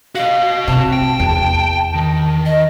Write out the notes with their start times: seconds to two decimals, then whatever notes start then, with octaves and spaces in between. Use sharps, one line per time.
0.15 F#4 D#5 F5
0.67 C3 A5
0.93 G5
1.19 E2
1.95 D#3
2.46 D#5